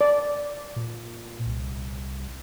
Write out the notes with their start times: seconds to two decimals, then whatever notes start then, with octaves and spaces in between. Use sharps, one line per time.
0.01 D5
0.76 A#2
1.46 C2